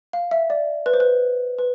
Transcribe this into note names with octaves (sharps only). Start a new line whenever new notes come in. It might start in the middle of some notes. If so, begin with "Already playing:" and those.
F5
E5
D5
B4
C5
B4
B4